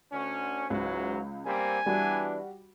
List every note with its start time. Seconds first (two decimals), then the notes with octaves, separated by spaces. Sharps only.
0.12 D2 D3 C#4
0.70 C#2 G#2 E3 F#3
1.46 G3 A#3 C4 G#5
1.86 E3 G3 B3 D4 F#4